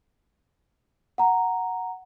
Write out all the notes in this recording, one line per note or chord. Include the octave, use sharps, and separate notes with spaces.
F#5 A#5